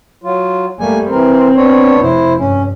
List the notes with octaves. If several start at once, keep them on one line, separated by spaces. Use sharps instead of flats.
F#3 F4
G3 A3 A#3 G#5
E3 C4 A#4
B3 D4 C#5
F1 E4 C5
G2 C#4